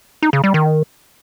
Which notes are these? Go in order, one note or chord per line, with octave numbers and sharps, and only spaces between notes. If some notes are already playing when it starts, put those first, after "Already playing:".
D#4
C#3
G3
D#3